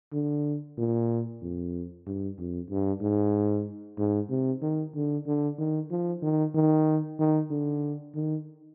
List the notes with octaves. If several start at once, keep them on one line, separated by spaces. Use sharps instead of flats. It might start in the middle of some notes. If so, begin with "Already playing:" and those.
D3
A#2
F2
G2
F2
G2
G#2
G#2
C3
D#3
D3
D3
D#3
F3
D#3
D#3
D#3
D3
D#3